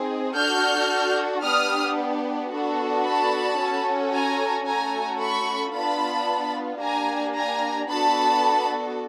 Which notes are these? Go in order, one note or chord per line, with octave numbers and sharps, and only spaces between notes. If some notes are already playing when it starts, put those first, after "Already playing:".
Already playing: C4 D#4 G#4
D4 F#4 A4 F6 G6
B3 D4 G4 D#6 F6
B3 D4 F#4 A4
A5 B5
C#4 F#4 A4
G#5 A#5
A3 C#4 F#4 A4 G#5 A#5
B5 C#6
B3 D4 F4 A5 B5
A#3 D4 G4 G#5 A#5
G#5 A#5
B3 D4 F#4 A4 A5 B5